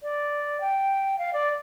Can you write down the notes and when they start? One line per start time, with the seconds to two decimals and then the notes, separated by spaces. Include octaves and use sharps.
0.03 D5
0.61 G5
1.18 F5
1.33 D5